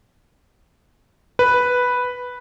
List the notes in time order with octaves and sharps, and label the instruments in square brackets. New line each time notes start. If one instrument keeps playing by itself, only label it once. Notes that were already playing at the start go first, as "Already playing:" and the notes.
[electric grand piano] B4